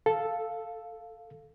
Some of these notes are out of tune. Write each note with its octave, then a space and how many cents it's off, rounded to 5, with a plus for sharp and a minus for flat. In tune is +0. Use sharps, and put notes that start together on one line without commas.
A4 +0 F5 +0